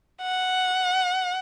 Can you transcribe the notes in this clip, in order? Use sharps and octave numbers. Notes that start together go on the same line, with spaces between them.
F#5